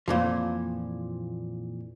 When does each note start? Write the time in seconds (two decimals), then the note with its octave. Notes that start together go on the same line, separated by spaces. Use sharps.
0.08 F2 A#2 E3 F3